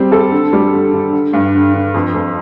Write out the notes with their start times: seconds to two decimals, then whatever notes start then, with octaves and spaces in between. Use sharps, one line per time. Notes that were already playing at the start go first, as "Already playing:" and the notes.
Already playing: G3 C4
0.12 A4
0.32 D3
0.53 G3
0.74 D3
0.94 D3
1.13 D3
1.33 G2
1.55 D3
1.74 D3
1.94 F2
2.14 F2